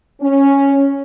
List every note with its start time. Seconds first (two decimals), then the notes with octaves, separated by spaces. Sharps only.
0.21 C#4